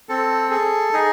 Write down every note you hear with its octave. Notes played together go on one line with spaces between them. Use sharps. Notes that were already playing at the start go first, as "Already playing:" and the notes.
C4 A4
G#4 A4
D#4 G#4